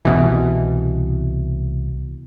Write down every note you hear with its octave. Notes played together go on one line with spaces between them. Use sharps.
C2 B2 E3